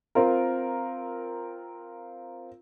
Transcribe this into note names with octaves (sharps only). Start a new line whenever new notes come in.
C4 F4 A#4